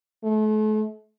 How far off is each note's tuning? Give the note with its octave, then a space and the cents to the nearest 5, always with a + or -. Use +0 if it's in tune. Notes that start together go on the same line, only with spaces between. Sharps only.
A3 -40